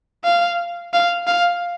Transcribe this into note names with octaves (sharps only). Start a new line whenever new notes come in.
F5
F5
F5